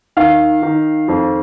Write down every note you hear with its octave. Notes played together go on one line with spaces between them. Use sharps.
D#3 F5
D#3
F2